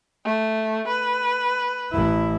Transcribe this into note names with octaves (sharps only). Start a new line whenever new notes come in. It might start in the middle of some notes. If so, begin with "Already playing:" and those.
A3
B4
A1 E4